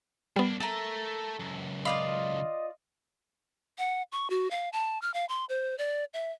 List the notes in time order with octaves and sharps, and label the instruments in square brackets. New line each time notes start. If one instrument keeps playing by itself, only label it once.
[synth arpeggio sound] G3 B3 [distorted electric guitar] A#3 D4
[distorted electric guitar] A3 [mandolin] A4 A#4
[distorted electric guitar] C#2 F#2
[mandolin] F4 D5 F5 [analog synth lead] D#5 [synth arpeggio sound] B5
[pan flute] F#5
C#6
F#4
F5
A5
F6
F5
C6
C5
D5
E5